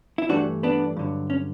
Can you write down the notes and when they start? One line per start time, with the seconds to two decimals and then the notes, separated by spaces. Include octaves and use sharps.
0.18 E4
0.29 G2 E3 A3 D4 F#4
0.63 B3 D4
0.97 G2 D3 F#3
1.30 C#4